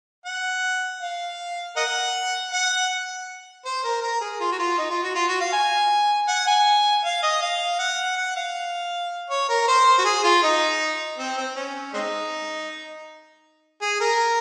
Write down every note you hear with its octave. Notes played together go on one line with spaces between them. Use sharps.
F#5
F5
A#4 D#5 F#5
F#5
C5
A#4
A#4
G#4
F4
F#4
F4
D#4
F4
F#4
F4
F#4
F5
G#5
F#5
G#5
F5
D#5
F5
F#5
F#5
F5
C#5
A#4
C5
F#4
G#4
F4
D#4
C4
C4
C#4
G#3 C4 D#4
G#4
A#4